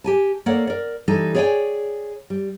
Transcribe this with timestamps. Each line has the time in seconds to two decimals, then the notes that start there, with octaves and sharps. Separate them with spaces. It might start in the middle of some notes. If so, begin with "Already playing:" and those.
0.04 G4 G#5 A5
0.46 A#3 A4 C#5 D5 F#5
0.67 A#4 D5
1.08 E3 G3 D#4 A4
1.35 G#4 C#5 D5 F5 G5 G#5
2.30 G3